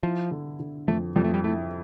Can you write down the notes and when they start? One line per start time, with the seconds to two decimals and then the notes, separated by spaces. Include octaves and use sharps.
0.03 F3 E4
0.31 D3
0.60 D3
0.88 F2 A3
1.16 F2 G3
1.24 A3
1.34 G3
1.44 A3 E4